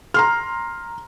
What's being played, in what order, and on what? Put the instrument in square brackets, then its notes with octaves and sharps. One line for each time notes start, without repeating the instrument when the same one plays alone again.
[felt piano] A#5 C6 F6